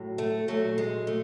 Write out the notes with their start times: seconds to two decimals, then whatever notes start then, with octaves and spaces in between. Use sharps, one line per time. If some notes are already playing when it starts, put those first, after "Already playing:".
Already playing: A2 F#3
0.18 A3
0.48 A#2 F#3 A3
0.78 G#3
1.07 A3